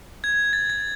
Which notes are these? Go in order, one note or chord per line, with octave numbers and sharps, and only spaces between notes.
G#6
A6
A6